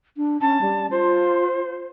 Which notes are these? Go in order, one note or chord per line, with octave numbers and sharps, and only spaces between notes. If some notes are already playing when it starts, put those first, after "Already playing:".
D4
C#4 A5
G3
F4 C5